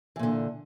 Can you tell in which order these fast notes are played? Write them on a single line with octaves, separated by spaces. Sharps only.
E3 A#2 D3